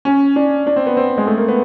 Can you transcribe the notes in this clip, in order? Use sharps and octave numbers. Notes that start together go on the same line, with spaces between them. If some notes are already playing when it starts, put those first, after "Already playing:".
C#4
D4
D4
C4
B3
C4
G#3
A3
A#3
B3